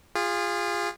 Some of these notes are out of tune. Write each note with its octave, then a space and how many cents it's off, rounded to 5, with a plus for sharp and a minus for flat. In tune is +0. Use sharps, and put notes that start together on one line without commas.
F4 +0 G#4 -30